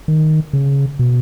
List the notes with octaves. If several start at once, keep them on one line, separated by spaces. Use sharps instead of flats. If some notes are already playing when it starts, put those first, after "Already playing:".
D#3
C#3
B2